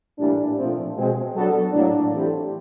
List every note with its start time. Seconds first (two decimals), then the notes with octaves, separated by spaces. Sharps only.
0.18 A2 E3 G3 A#3 D4
0.57 A#2 F3 A3 C4
0.96 B2 G#3 C4
1.34 F#3 B3 D4 F#4 A4
1.73 A2 F#3 A#3 D4
2.11 E3 A3 C4 E4 G4